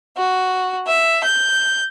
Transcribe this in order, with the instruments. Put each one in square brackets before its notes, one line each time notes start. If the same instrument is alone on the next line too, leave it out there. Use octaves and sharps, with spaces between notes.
[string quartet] F#4
E5
G6